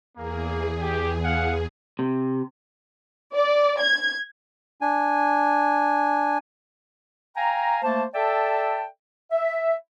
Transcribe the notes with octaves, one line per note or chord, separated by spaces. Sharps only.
E2 A#3 G#4
G4
F5 F#5
C3
D5
G#6
D4 G#5
F5 G5 G#5 A#5
A3 A#3 C5 A5
A4 D5 E5 G5 A5
E5